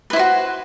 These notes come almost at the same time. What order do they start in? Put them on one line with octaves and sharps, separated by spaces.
B4 E4 C5 F#4